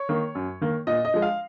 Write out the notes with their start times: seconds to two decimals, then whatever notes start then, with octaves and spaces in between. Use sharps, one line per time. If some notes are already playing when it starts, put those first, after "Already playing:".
Already playing: C#5
0.09 D#3 A#3
0.35 F#2
0.61 D#3 A#3
0.87 A#2 D#5
1.05 D#5
1.14 F3 G#3
1.22 F5